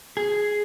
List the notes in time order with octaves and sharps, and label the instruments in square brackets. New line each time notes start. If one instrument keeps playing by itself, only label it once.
[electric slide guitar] G#4